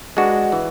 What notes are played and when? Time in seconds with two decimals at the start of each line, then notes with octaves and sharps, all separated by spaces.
0.17 G#3 D4 F#4 B4
0.52 E3